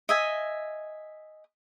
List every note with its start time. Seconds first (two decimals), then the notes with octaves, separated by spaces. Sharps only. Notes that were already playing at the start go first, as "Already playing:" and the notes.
0.09 D#5 E5 G#5